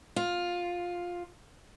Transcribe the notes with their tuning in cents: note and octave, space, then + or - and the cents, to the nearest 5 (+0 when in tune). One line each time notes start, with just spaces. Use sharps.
F4 +10